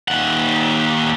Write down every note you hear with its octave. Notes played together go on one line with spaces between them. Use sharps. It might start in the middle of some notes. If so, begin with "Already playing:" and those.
D#2 F#5